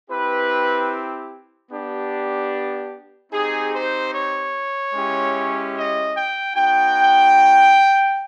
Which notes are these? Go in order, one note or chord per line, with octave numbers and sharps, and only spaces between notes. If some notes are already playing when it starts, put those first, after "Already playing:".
C4 E4 G4 B4
B3 D4 G4
C4 D#4 G4 G#4
C5
C#5
G#3 C#4 E4 G4
D#5
G5
B3 D#4 F#4 G5